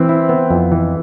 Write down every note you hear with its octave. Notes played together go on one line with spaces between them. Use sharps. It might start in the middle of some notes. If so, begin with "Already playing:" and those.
Already playing: E3 C4
E4
B3
F2
E3